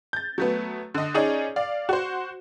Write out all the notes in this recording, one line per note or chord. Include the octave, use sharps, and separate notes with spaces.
G6 A6
F#3 A3 B3
D3 D#5
C#4 D#4 G#4 D5
D5 F5
F#4 C5